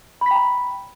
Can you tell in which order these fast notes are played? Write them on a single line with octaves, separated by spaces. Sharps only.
B5 B6 G5 A#5